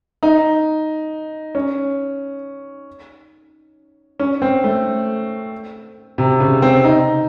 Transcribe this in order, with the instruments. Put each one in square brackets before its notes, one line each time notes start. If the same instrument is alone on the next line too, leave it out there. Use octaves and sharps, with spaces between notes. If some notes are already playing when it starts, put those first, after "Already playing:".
[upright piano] D#4
C#4
C#4
C4
A3
C3
C#3
C4
D#4